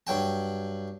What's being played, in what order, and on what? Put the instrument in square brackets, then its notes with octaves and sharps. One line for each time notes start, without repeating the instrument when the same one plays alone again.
[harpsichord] G2 F#3 G5 A5